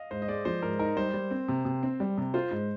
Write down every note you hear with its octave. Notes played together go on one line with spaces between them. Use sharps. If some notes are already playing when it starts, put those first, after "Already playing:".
Already playing: D#5 F5
G#2 C5
D#5
G#3 D5
F3 C5
G#2 A#4
D#4 A#4
G3 C5
G3
C4
C3
C3
C4
G3
C3
F4 C5
G#2